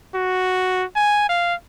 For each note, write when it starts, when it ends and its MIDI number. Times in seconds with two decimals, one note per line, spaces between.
0.15 0.84 66
0.96 1.29 80
1.29 1.54 77